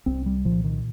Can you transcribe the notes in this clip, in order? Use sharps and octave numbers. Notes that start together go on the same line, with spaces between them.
C2 C4
G3
A#2 F3
D#3